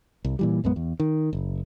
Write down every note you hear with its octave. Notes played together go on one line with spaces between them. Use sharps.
C2
A#2 E3 G3
A#1 F#2 G#3 B3
E2
D#3
F#1